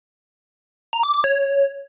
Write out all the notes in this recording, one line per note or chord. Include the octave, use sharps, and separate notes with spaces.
A#5
D6
D6
C#5